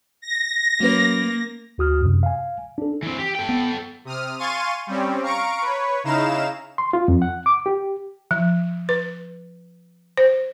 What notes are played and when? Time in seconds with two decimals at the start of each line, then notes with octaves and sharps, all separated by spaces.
0.21 A#6
0.80 F#3 A#3 C#4 B4
1.78 D2 F#4 D#6 F6
2.02 F#2 C3
2.23 F5 G#5
2.78 D4 A4
3.03 E3 C4
3.19 G4
3.35 A4 G5
3.49 B3
4.05 C3 D#6 F6
4.38 F5 G#5 C6 C#6 A6 D#7
4.87 G3 C4 C#4
5.22 F5 A#5 C#6 D7
5.62 B4 C#5
6.04 C#3 D#4 E4 F5 A#5 E7
6.78 C6
6.93 F4
7.08 F2
7.22 F#5
7.46 D6
7.66 G4
8.31 F3
8.89 B4
10.18 C5